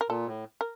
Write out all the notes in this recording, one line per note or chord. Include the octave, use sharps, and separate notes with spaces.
A#4
A#2 A4
A2
A#4